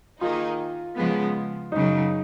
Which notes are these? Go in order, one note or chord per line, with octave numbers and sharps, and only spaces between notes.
D#3 A#3 D#4 F4 G#4
C#3 F3 G#3 B3
F#2 C#3 F#3 D#4